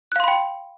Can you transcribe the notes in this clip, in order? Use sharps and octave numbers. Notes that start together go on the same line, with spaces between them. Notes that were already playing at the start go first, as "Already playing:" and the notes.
F5 G5 B5 C6 F#6